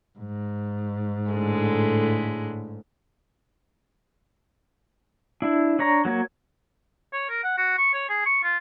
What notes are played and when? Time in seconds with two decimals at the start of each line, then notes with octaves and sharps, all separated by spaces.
0.18 G#2
1.32 A2 D3 G#3
5.42 D4 E4
5.79 D4 C#5 A#5
6.05 F#3 A#3 C#5
7.13 C#5
7.30 A#4
7.44 F#5
7.58 F#4
7.78 C#6
7.94 C#5
8.09 G#4
8.26 C#6
8.43 F4